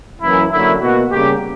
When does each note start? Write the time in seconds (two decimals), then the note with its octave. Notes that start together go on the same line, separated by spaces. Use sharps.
0.22 F#2 E3 A#3 E4
0.51 F#2 D3 F#3 A#3 E4
0.81 B2 A#3 F#4
1.11 C#3 G3 A#3 G4